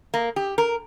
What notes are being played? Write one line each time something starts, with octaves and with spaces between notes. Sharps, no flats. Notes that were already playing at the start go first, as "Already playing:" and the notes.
A#3
G4
A#4